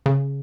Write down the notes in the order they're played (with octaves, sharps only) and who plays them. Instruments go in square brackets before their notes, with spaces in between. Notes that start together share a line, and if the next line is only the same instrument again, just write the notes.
[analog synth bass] C#3